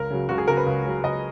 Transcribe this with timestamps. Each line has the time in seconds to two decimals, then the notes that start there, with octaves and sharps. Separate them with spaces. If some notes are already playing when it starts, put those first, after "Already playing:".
Already playing: C#2 A#4
0.11 C#3 F#3
0.29 C#2 F#4
0.38 G#4
0.47 C#3 F#3 A#4
0.57 B4
0.66 C#2
0.85 C#3 F#3
1.03 C#2 D#5